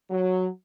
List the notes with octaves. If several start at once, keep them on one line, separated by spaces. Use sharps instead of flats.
F#3